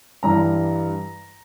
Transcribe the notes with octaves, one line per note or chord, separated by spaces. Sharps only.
G2 E3 G3 A#5